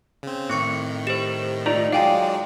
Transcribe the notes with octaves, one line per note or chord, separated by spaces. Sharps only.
C#3 C4
A2 D#3 C4 C#6 C#7
G4 C5 E7
A3 D#4 F4 D5 A#5
F#3 G#3 D5 F5 G5 G#5